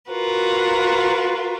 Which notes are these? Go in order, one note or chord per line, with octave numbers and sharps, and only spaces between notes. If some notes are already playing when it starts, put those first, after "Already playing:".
F4 F#4 A#4 B4